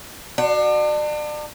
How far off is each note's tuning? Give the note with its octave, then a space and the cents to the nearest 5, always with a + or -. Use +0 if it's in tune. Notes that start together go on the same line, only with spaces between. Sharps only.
D4 +35 F#4 +0